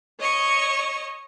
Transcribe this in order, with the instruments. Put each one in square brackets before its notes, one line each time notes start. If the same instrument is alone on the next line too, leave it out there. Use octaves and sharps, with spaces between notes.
[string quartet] C#5 D#5 C#6